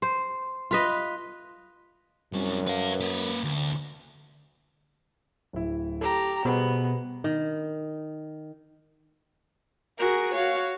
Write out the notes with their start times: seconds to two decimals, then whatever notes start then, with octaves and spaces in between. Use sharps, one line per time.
0.02 C5
0.71 F4 B4 D#5
2.33 C2 F#2 G3
2.67 B4 F5
3.01 A#3 B4
3.44 D2
5.53 D1 E4
6.01 G4 A4 A#5
6.45 B2 G3 B3 G#4 C5
7.24 D#3
9.99 F#4 G#4 A#4
10.36 F#4 C#5 F5